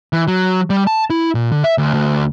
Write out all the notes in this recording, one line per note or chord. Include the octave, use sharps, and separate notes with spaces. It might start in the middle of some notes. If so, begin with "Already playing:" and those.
E3
F#3
G3
A5
E4
A#2
D3
E5
D2
D2